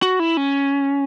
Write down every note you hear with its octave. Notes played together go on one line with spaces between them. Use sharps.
F#4
E4
C#4